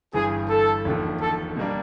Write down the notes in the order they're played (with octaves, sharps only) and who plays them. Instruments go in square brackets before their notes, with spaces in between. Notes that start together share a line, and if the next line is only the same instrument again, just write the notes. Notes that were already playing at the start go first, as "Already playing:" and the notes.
[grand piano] G1 G2 E3 [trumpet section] G#4
[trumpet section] A4
[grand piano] E1 D#2 D3 F3
[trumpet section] A4
[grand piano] B2 G3 A#3 D4